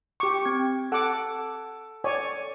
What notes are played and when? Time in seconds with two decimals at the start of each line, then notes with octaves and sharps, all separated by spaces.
0.20 G4 C#6 D6
0.45 C4 G#6
0.92 A4 F#5 A5 D6
2.04 C#5 D5 G#5